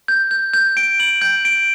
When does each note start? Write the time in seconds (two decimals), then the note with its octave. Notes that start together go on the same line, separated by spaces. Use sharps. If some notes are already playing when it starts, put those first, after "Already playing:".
0.08 G6
0.31 G6
0.53 G6
0.77 D7
1.00 F#7
1.22 G6
1.45 D7